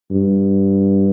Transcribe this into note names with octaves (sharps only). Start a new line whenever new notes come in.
G2